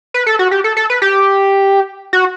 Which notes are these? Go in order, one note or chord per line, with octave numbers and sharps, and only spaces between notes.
B4
A4
F#4
G4
A4
A4
B4
G4
F#4